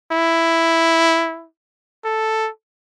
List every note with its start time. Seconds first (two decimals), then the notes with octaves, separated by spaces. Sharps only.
0.12 E4
2.04 A4